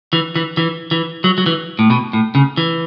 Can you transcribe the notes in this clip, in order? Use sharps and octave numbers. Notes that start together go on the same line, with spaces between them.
E3
E3
E3
E3
F#3
F#3
E3
A2
B2
A2
C#3
E3